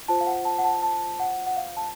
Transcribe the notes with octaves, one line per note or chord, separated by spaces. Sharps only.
F4 C5 A5
F5
F#5
A5
F#5
A5
A5
F#5
F#5
F5
A5